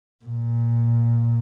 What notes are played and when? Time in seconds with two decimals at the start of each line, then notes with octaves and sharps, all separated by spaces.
0.25 A#2